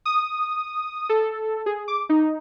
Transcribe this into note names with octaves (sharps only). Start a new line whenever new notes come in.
D#6
A4
G#4
D6
D#4